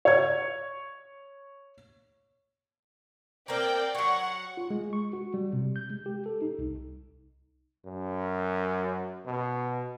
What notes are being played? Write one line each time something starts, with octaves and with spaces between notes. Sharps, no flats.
C#5 G#6
A#3 C4 A#4 D5 G5
F#3 C#5 F#5 C#6
F4
G#3
C#6
F#4
G3
C3
G6
G#3
G4
A4
D#4
C2
F#2
B2